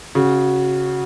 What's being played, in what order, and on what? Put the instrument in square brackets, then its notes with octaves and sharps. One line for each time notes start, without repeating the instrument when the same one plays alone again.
[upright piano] C#3 [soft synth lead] F#4